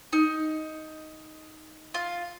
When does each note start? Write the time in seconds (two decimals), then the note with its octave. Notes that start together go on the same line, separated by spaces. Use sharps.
0.13 D#4
1.94 F4